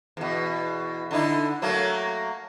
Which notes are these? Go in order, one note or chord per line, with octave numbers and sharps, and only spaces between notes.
E2 B2
D3 D#4 E4
F#3 A3 A#3